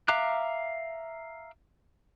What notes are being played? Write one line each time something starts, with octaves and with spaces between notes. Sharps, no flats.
E5 F5 A#5 D6 F#6